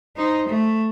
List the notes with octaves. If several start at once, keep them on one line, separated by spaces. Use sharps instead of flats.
D#4 C5
A3